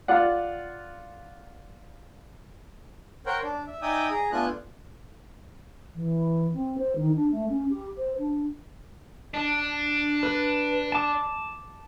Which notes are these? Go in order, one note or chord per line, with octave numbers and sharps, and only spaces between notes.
F4 D5 F#5
A#4 C5 C#5 F#5 G5
D4
E5
D#4 D5 E5 G5 G#5 D#6
G#4 A#5
A3 B3 D4 F4 G#5 F#6
E3
C4
C5
D#3
D4
A3
C#4
G4
C5
D4
D4
B4
A5 D6